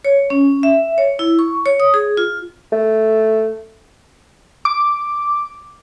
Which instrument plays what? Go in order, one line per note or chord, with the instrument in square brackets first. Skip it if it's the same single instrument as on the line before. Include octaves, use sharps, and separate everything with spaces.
[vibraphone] C#5
C#4
E5
C#5
E4
C#6
C#5
D#6
G#4
F4
[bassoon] A3
[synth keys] D6